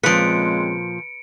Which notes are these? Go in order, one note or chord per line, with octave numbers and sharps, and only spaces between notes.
A#2 C#3 F3 G#3 C4 B4 C#7 D7